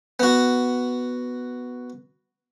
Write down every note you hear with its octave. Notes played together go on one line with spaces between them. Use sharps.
B3 F#4